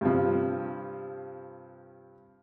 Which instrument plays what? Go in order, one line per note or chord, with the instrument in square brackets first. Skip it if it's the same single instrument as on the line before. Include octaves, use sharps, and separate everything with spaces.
[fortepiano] G2 C3 F3